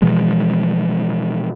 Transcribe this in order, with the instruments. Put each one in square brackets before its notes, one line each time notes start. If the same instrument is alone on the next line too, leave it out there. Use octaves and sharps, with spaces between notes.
[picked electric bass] B2 E3 F3 G#3